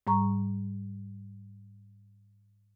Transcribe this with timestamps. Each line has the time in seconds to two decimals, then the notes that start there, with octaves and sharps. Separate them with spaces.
0.07 G#2 G3 A#5 C#6